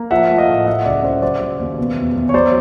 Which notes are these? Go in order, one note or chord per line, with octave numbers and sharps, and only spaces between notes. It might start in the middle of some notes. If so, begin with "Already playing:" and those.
Already playing: A#3
F3 E5 F#5
A3
D#5 F5
A2
F#3 E5 F#5
C#2 D5 E5
C#3 C5 D5
F#3 C5 D5
F#3
D#2
B2
E2
E2
C#5
F#3 C5 D5